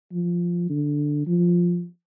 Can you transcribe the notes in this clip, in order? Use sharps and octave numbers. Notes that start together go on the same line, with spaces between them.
F3
D3
F3